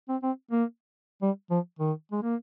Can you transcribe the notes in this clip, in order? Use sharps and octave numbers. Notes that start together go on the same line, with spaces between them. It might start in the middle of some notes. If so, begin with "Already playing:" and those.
C4
C4
A#3
G3
F3
D#3
G#3
A#3